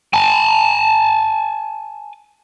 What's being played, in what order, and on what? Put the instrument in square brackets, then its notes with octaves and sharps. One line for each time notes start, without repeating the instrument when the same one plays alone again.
[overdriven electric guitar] G#5 A5